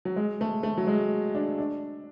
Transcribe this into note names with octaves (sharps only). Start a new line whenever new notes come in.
F#3
G#3
A3
A3
F#3
G#3
D4
D4